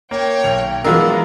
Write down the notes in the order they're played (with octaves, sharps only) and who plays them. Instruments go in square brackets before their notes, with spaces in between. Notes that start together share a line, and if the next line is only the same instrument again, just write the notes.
[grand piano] A#3 [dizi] C#5 [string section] G5
[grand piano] B1 [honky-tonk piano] F7
[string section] E3 [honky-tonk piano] F#3 F4 A#4 [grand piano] G#3 B3 D4 [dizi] E6